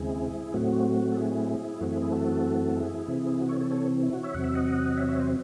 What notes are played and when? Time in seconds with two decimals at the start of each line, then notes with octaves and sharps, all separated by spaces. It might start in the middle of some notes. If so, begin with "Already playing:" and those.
Already playing: D#2 C#3 G#3 C4 E4 G#4
0.54 A2 F#3 A3 C4 F#4
1.12 A4
1.17 E4 G#4
1.80 F#2 E3 A3 C4 F#4
1.91 E4 G#4
2.01 E4 G#4
2.12 F#4 A4
2.76 E4 G#4
3.08 C3 E3 C4
3.39 F#4
3.49 A4 C#5
3.60 A4 C#5
3.71 A4 C#5
4.03 E4
4.13 F#4
4.23 C#5 E5
4.34 E2 C3 F#3 C4 F#5
4.44 E5
4.55 D#5 F#5
4.97 C#5 E5
5.08 C#5 E5
5.19 C5 D#5